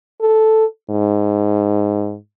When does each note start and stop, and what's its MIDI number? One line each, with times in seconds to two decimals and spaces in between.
0.21 0.65 69
0.90 2.16 44